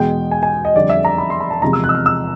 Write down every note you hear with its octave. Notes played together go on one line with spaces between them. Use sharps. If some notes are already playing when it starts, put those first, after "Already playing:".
Already playing: E2 B2 G#3 G5
G#5
G#5
D#5
F2 D3 G3 D5
E5
A#5
B5
C6
B5
A5
E2 C3 F3 G#3 A#5
E6
F#6
E6
F6
E6